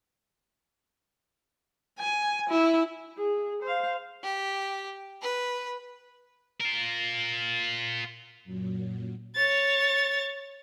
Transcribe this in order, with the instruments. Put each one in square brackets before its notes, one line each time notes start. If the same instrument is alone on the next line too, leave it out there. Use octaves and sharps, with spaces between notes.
[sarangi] G#5
E4
[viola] G#4
C5 F5
[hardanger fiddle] G4
B4
[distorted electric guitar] F4 A#4
[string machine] F#2 A#2 F#3
[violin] C#5 A6